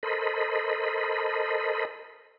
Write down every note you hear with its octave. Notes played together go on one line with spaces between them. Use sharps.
A4 A#4 C5 D#5 B5